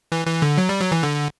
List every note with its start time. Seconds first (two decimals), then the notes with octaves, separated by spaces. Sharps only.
0.12 E3
0.27 E3
0.42 D3
0.58 F#3
0.69 G3
0.80 F#3
0.92 E3
1.03 D3